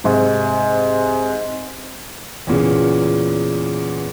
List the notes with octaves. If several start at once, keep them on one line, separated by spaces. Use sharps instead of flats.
G#2 C3
E2 A#2 C#3